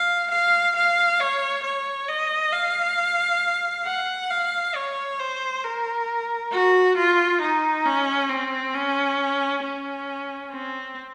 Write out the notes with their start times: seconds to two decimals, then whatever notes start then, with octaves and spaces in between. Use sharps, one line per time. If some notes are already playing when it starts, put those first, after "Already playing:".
Already playing: F5
0.31 F5
0.76 F5
1.20 C#5
1.63 C#5
2.08 D#5
2.52 F5
3.86 F#5
4.31 F5
4.75 C#5
5.19 C5
5.64 A#4
6.51 F#4
6.97 F4
7.41 D#4
7.85 C#4
8.29 C4
8.74 C#4
9.63 C#4
10.51 C4